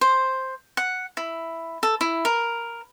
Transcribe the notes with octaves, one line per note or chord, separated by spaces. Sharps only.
C5
F#5
E4
A4
E4
A#4